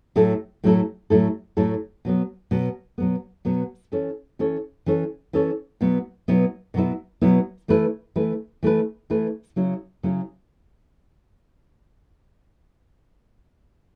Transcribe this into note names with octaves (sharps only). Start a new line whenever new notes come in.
A2 F#3 A3 E4 A4
A2 F#3 A3 E4 A4
A2 F#3 A3 E4 A4
A2 F#3 A3 E4 A4
B2 F#3 B3
B2 F#3 B3
B2 F#3 B3
B2 F#3 B3
E3 C#4 A4 C#5
E3 C#4 A4 C#5
E3 C#4 A4 C#5
E3 C#4 A4 C#5
B2 F#3 B3 E4
B2 F#3 B3 E4
B2 F#3 B3 E4
B2 F#3 B3 E4
E3 A3 E4 B4
E3 A3 E4 B4
E3 A3 E4 B4
E3 A3 E4 B4
C#3 F#3 C#4 E4
C#3 F#3 C#4 E4